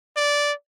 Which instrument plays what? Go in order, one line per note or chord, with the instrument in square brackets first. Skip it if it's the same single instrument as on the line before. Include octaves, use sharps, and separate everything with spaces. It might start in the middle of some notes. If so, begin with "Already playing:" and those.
[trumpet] D5